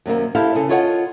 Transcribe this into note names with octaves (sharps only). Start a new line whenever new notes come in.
F#2 C3 D#3 A#3
E4 G4 A4 C5 E5 F5
C#3 G#4 A4
F4 A4 C#5 D#5 E5 F#5